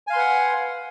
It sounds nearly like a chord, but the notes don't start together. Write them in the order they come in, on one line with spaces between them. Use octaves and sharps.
G#5 F5 C6 B4 F#5